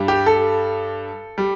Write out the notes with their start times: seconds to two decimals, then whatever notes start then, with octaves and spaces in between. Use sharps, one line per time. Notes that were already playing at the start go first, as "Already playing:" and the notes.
Already playing: G2 G3
0.08 G4
0.26 A4
1.38 G3